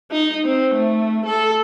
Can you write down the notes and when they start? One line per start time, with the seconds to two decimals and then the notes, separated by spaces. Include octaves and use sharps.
0.11 D#4
0.45 C4
0.75 A3
1.26 A4